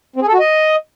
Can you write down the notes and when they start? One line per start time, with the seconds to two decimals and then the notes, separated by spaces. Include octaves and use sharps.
0.16 C4
0.22 G#4
0.28 A4
0.33 F#4
0.39 D#5